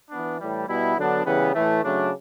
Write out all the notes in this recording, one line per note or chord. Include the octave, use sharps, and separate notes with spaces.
E3 B3 D4
A2 E3 G3
B2 G3 B3 E4
D3 F#3 B3 D4
C#3 E3 G3 B3
A2 E3 A3
C#3 F#3 A3 D4